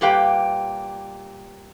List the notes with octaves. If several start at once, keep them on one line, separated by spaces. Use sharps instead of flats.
A#2 G3 G4 B4 F5 G5